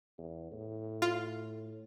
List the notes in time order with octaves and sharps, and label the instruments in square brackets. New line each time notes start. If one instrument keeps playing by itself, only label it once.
[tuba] E2
A2
[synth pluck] F4